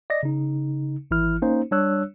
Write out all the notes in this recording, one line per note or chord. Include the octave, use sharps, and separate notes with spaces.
D5 D#5 A#6
C#3 D#4
G#1 E3 E4 F6
A#3 C#4 D#4 C5
G3 D4 C#5 E6 F#6